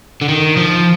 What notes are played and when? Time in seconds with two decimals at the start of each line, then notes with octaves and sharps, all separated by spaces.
0.21 D3
0.29 D#3
0.57 F3